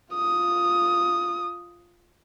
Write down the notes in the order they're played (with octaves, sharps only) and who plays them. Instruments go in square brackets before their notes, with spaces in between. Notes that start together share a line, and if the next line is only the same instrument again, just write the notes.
[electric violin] F4 D#6